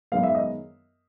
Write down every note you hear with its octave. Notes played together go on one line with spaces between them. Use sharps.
F#2 D#3 G#3 B3 F5
E5
D#5